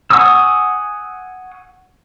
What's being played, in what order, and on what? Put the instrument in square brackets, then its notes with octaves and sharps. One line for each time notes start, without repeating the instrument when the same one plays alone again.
[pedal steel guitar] F#5 G#5 C#6 D#6 E6